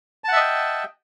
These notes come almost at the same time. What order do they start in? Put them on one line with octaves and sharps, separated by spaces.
A5 F#5 E5 D#5 G5